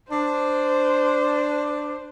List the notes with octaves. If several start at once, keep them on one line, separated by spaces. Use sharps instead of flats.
D4 C5